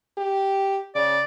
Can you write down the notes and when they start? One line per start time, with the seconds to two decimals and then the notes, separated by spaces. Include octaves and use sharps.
0.18 G4
0.95 C#3 D5